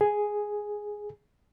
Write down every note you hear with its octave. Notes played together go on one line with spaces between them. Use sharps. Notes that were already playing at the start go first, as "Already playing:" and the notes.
G#4